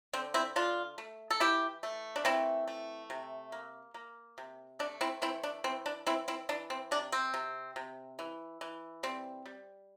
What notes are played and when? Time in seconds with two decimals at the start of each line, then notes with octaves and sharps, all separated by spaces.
0.13 D3 C4
0.34 C4 E4
0.56 D3 D4 F4
0.98 A3
1.30 A4
1.40 E3 E4 G4
1.83 A3
2.16 D4
2.25 E3 C4 E4
2.68 A3
3.10 C3
3.52 A#3
3.94 A#3
4.38 C3
4.79 A3 D4
5.01 C4 E4
5.22 E3 C4 E4
5.43 D4
5.64 E3 C4
5.86 D4
6.07 E3 C4 E4
6.28 C4 E4
6.49 E3 D4
6.70 C4
6.91 C3 D4
7.12 C4
7.34 C3
7.76 C3
8.19 E3
8.61 E3
9.03 G3 C4
9.46 G3